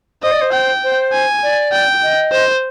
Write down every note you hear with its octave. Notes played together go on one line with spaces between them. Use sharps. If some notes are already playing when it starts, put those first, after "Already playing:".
C5 D#5
D5
C5
G5
C5
G#5
D5
G5
D#5
C5